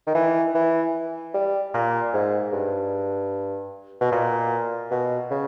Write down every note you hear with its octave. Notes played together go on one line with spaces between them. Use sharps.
D#3
E3
E3
G3
A#2
G#2
G2
B2
A#2
B2
C#3